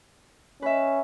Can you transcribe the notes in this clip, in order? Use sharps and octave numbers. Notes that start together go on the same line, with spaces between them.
C#4 B4 E5